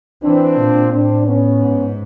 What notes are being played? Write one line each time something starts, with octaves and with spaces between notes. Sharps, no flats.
E3 C4 D4
A#2
A2 C4 D4
B3 C#4
G#2